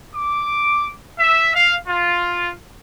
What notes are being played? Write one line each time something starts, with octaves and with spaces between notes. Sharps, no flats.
D6
E5
F5
F4